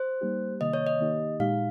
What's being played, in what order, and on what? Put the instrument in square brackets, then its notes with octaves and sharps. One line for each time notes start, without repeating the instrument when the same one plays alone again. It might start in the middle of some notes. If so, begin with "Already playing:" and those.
Already playing: [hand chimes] C5
[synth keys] G3 A#3 D#4 G4
[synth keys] C3 D#3 A#3 [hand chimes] D#5
[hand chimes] C#5
D#5
[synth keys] D#3 A#3 D#4 G4
[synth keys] A#2 G#3 D#4 G4 [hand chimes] F5